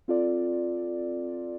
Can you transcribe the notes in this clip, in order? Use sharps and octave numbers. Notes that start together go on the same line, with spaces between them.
C4 F4 A4 D5